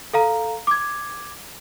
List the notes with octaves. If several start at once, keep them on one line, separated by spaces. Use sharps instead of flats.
A4 F5 A#5
D6 G#6